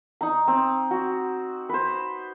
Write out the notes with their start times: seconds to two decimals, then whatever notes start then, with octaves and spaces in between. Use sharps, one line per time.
0.21 D#4 A#5
0.48 C4
0.91 F#4
1.69 B4 C5